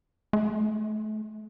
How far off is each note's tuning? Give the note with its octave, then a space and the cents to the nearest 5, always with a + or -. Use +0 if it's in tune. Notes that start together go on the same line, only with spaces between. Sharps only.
A3 -35